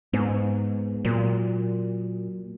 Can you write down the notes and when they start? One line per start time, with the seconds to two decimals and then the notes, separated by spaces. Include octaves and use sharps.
0.13 G#2 G#3 B3
1.05 A#2 F#3 A#3